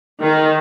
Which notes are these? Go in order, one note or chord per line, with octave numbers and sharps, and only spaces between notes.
D#3